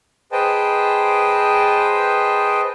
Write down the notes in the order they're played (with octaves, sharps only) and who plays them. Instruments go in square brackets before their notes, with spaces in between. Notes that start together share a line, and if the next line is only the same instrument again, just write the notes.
[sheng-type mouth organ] G#4 B4 C5 D#5 G5 A5